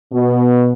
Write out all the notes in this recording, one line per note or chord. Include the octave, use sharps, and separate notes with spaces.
B2